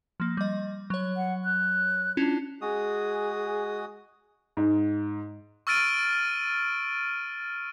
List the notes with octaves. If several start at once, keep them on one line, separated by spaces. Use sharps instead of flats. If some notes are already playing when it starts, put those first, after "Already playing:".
F3 A#3
G3 D#5
F#3 C#5
F#5
F#6
C#4 D4 E4 F4
G#3 F#4 G#4 D#6
G#2
C#6 E6 F6 A6 D7 D#7